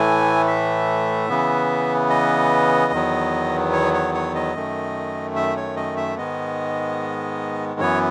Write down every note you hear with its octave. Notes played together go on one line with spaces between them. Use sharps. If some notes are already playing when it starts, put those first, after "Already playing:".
Already playing: A2 E3 A3 G#5
E5
C#3 E3 B3
D#5
E2 D#3 F#3 B3
C#5
C#5
C#5
D#5
F#2 D#3 A3
E5
C#5
D#5
E5
G#2 D#3 G#3 B3 D#5
F#2 E3 B3 C#5